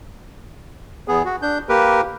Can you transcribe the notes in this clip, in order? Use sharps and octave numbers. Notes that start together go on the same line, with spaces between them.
E2 B3 G#4
F#4
D4 G6
A#3 G4 A#4 B4